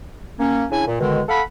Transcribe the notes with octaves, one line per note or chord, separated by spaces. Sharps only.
A#3 C#4
C#3 D4 E4 G#5
A#2
B2 D3 D#3 G#3
A4 F5 F#5 B5